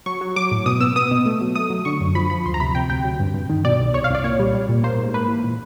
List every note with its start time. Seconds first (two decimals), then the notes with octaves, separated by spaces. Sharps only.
0.06 F#3 C#6
0.21 F#3
0.36 F#3 D6
0.51 A2
0.66 B2 D#6
0.81 B3 E6
0.96 B3 D#6
1.11 B2
1.26 A3
1.41 F#3
1.55 A3 D#6
1.70 F#3
1.85 D3 C#6
2.01 F#2
2.15 F3 B5
2.30 F3 B5
2.45 D2 C6
2.54 A#5
2.60 C3 B5
2.75 C3 G5
2.90 D2 G5
3.04 F#3
3.20 G2
3.34 G2
3.50 D#3
3.65 B2 D5
3.80 C2
3.94 C2 C#5
4.04 F5
4.10 C2 D5
4.24 A#2 C#5
4.40 G3
4.54 G3
4.69 A#2
4.84 A#3 C5
4.98 G#2
5.14 A#3 B4
5.28 E3
5.44 A#2